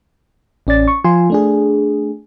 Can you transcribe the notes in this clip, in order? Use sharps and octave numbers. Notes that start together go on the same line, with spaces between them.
A1 C#4 D5 A6
C#6
F3 F4 G#5 C6
A3 D4 G#4